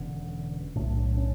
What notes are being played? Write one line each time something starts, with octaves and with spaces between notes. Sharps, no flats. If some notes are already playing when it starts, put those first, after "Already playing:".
Already playing: E1 E2 D3 C#4
B1 A2 D4
C#4